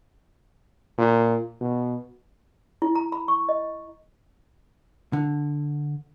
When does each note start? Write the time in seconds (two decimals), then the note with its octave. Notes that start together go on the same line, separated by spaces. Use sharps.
0.98 A#2
1.61 B2
2.82 E4
2.95 A#5
3.12 B5
3.28 C#6
3.49 D#5
5.13 D3